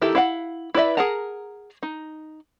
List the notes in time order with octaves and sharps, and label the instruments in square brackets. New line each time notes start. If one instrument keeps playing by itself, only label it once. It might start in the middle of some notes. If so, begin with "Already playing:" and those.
[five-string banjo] D#3 E4 G4 A4 A#5
E4 F5 F#5
E4 B4 D5 E5
G#4 A#4 F#5 A5 A#5
D#4